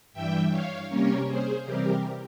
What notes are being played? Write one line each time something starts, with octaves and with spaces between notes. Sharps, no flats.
G2 E3 G3 E5 G5
C#5 F5
C3 G3 A#3 C#4 A#4 C#5
G#4 C5
C3 E3 G3 C4 G4 A#4